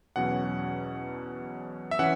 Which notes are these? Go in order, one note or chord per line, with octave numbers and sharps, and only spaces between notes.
E2 B2 F#3 C#4 F#5
E5
E3 C#4 F#5